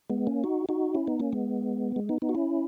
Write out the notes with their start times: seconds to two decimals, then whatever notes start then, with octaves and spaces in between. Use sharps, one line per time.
0.10 G#3 B3
0.27 A#3 C#4
0.44 D#4 F#4
0.69 D#4 F#4
0.95 C#4 E4
1.07 B3 D#4
1.20 A#3 C#4
1.33 G#3 B3
1.96 G#3
2.09 B3 D#4
2.22 B3 D#4
2.29 F#4
2.35 C#4 E4